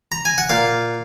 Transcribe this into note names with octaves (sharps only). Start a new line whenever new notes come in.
A#5
G#5
F#5
A#2 F5